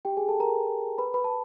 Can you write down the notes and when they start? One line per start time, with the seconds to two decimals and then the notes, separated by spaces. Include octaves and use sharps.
0.05 G4 G5
0.17 G#4 G#5
0.28 A4 A5
0.40 A#4 A#5
0.98 B4 B5
1.14 B4 B5
1.24 A5